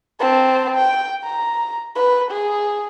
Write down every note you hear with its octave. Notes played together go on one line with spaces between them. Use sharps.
C4 A5
G5
A#5
B4
G#4